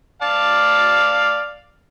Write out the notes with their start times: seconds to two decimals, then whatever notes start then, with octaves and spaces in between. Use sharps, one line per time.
0.22 D5 F5 A5